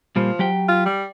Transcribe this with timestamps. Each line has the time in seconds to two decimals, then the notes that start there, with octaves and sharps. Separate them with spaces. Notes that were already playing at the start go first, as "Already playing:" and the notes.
0.16 A#2 F3 G3 A#3
0.39 F#3 G4 G5
0.69 F4
0.86 G3